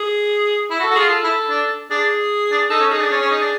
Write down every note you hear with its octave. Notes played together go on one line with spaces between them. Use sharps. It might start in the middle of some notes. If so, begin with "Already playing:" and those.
Already playing: G#4
E4
F#4
A4
F#4
F4 G#4
F4 A4
E4
D4
D4 G#4
D4
D#4 A4
C#4
D#4 G#4
D4
C#4
C#4
D#4
D4